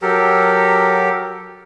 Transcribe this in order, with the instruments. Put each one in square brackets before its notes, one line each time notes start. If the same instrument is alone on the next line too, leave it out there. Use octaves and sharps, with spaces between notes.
[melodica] F#3 G4 A4 A#4